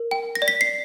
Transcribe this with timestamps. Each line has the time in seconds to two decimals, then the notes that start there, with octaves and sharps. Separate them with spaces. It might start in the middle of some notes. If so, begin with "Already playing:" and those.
Already playing: A#4
0.11 G5
0.35 A#6
0.42 D5
0.48 B6
0.61 C7